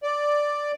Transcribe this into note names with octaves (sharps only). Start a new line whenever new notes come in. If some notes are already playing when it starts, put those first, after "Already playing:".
D5